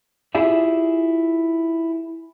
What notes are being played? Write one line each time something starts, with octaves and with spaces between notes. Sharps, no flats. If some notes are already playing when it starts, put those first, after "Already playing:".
E4 F4 G4 G#4 D5 E5